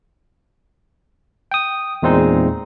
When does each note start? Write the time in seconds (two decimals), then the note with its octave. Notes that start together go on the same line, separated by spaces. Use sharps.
1.51 G5 D#6
2.02 E2 A#2 G#3 C4 D#4